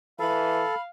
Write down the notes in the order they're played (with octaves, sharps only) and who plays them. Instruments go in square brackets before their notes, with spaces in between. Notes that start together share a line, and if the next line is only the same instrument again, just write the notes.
[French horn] E3 [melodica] A4 [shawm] F5 [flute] B5